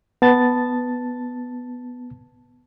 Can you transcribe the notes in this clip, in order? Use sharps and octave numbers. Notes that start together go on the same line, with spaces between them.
B3 A5 A6